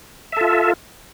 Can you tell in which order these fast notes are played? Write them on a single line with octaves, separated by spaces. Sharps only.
E5 A4 F4